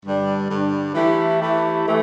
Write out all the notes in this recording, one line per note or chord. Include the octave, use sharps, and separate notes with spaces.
G2 D3 G3 D4
G2 D3 G3 D4
E3 A3 E4 G4
E3 A3 E4 G4
E3 A3